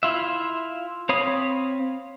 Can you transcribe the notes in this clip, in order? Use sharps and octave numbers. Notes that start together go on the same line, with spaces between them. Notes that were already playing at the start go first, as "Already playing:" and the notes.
E4 F4 E5
C4 C#5 F5 B5 D#6